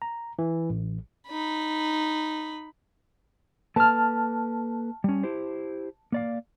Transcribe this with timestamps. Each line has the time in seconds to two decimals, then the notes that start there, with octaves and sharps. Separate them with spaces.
0.02 A#5
0.39 E3
0.70 A1
1.28 D#4 B5
3.76 A#3 A4 B4 A5 F6
5.04 G3 C#4
5.23 E4 G4 C5
6.12 A#3 D5 F5